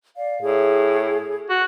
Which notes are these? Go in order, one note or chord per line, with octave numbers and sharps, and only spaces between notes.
D5 F5
A2 G#4
F#4